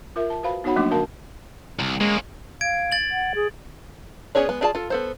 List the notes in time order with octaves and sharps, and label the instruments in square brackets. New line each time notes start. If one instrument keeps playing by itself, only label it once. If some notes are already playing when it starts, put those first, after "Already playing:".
[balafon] F4 A#4 E5
A5
F#4 B4 C5 F5 B5
B3 D#4 F#4 C#5 F#5 B5
F3 F#3 A3 A#3 D4 D6
D3 F#4 A#4 F5 A5
[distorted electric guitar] C2
[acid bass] G#3 [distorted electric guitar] A#3 C#4
[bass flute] F5 [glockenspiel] G#6 D7
[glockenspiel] A6 F#7
[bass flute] F#5
G#4
[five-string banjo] B3 C#4 G#4 C#5 D5
G#3 B3
D4 F4 G#4 D5 A5
F4 A4
B3 A4 C5